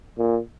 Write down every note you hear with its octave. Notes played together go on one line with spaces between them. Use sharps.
A#2